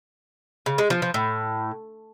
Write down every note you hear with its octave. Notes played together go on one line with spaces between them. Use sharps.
C#3
G#3
F3
F3
A2